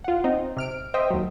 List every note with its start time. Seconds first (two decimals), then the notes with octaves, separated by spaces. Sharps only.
0.04 F4 F#5
0.24 C4 D#4
0.57 C3 F6 D7
0.94 C5 D#5 E5 G5
1.10 D#2 F#3